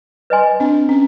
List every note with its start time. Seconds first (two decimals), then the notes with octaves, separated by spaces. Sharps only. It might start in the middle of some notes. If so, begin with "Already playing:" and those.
0.30 B4 D#5 G#5 C6
0.60 C4 D4
0.89 C#4